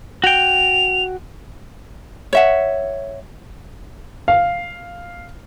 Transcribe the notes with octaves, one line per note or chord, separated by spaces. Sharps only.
F#4 G5 F7
C#5 E5 F#5
F5